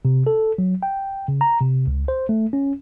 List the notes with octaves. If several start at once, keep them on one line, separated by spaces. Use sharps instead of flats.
C3
A4
F#3
G5
C#3
A#5
C3
C#2
C5
A3
C#4